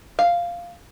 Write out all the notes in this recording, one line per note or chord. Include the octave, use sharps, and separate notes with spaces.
F5